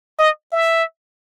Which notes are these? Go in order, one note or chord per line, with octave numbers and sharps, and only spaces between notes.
D#5
E5